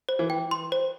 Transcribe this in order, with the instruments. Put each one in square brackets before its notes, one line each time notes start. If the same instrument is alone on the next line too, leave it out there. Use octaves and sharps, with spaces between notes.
[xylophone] C5
[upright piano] E3
[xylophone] G5
C6
C5